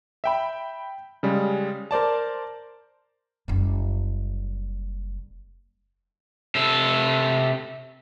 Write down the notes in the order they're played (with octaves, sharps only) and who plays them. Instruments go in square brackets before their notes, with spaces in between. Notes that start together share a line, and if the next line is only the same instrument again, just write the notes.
[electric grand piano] E5 G5 B5
C#3 G3 G#3
A#4 C5 D5 A5
[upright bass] F#1 G3
[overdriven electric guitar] C3 A4